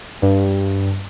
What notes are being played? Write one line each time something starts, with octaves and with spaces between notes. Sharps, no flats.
G2